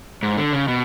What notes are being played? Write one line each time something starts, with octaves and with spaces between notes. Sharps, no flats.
G#2
D3
C#3
B2